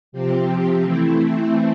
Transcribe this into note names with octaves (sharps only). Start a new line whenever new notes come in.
C3 F3 C4 G4
E3 A3 C4 E4